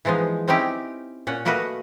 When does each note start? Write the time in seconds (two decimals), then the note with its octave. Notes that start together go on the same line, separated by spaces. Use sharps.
0.05 E3 F3 G#3 B3 D#4
0.47 C4 C#4 D#4 E4 G4
1.27 A#2 C#4 F#5
1.45 A3 A#3 F#4 A#4 B4 D#5